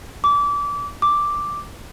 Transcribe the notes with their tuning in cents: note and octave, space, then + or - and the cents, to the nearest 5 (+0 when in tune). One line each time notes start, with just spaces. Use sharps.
D6 -25
D6 +0